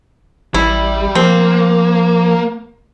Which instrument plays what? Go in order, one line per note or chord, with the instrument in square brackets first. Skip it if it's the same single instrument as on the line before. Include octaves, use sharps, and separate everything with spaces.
[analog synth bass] A1 [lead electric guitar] G3 [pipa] E4
[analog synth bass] F3 [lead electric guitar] A#3 [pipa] C4